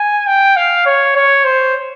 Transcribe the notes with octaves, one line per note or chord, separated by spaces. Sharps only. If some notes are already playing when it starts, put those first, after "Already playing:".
Already playing: G#5
G5
F5
C#5
C#5
C5